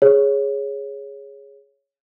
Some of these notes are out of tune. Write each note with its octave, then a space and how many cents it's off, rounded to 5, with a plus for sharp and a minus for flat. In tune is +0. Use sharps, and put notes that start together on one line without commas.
G#4 +0 C#5 +0